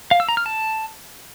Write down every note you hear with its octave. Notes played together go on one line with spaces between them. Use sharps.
F5
E6
A#5
F6
A5